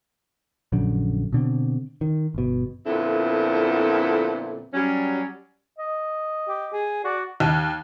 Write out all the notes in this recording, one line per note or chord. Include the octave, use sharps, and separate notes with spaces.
A#1 F#2 D3
B2 D3 C4
D#3
G1 B2
F2 A#2 D3 B3 C4 E4
F#3 G3 C#4
D#5
G4
G#4
F#4 D5
D#2